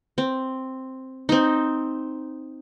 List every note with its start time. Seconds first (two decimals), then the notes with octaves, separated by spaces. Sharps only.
0.18 C4
1.29 C4 D#4